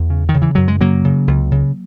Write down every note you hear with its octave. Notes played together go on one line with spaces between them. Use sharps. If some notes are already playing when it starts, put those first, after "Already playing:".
Already playing: E2 F#3
C#3
D#3
C#3
E3
F#2 F#3
G#3
C#3 F#3 A#3
C#3
C#2
C#3